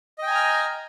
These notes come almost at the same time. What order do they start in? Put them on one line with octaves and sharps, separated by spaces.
D#5 G5 G#5 A#5 F6